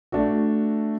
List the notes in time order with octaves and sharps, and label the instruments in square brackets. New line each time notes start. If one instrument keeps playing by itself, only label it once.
[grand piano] A3 D4 F#4